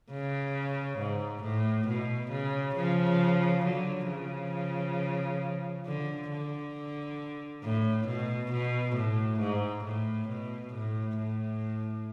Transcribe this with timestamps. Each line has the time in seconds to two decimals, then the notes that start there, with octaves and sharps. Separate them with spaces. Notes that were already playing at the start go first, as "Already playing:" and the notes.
0.11 C#3
0.99 G#2
1.43 A2
1.88 B2
2.32 C#3
2.76 C#3 F3
3.65 D3 F#3
4.09 C#3 F3
5.86 D3
6.30 D3
7.64 A2
8.07 B2
8.52 B2
8.96 A2
9.40 G#2
9.85 A2
10.29 B2
10.74 A2
11.17 A2